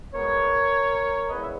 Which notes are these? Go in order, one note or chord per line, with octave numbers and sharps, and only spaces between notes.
B2 G#3 B3 A#4 C#5
E2 C#3 G#3 B3 B4 D#5
E5